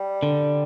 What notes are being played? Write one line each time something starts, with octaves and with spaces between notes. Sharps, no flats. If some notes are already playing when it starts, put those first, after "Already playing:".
Already playing: G3
D3